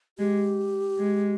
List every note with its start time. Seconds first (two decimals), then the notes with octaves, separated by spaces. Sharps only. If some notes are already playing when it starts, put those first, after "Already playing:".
0.18 G#3 G4
0.98 G#3